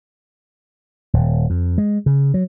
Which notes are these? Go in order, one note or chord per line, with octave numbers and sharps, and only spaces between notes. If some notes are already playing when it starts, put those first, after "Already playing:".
D#1
F2
G#3
C#3
F#3